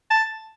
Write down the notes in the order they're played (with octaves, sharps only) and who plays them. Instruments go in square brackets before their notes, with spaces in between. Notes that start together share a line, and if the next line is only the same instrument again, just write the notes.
[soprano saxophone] A5